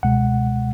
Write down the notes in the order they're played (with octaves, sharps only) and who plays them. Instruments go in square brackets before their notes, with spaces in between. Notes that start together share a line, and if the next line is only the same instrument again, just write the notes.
[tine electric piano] C#2 B2 G#3 F#5